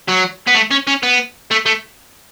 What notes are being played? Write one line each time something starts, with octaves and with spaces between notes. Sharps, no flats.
F#3
B3
A3
C#4
C#4
B3
A3
A3